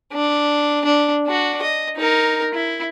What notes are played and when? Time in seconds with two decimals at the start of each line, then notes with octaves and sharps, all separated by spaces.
0.13 D4
0.85 D4
1.26 D4 F#4
1.62 D#5
1.96 D#4 A#4
2.54 E4